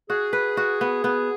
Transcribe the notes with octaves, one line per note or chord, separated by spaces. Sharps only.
F#4 G#4
B4
F#4
B3
B3